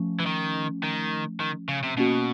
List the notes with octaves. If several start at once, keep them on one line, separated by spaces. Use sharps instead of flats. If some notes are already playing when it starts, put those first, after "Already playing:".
Already playing: F3 A3 C#4
E3
D#3
D#3
D#3
C#3
C3
B2 A#3 C#4 F#4